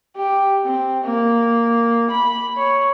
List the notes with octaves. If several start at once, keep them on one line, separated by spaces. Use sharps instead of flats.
G4
C4
A#3
B5
C#5